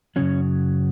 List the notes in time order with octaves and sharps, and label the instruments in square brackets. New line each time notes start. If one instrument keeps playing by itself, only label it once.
[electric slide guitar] F#2 C#3 F#3 C#4